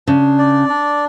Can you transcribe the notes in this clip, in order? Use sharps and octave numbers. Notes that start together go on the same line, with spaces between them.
C#3 D4
D5
D4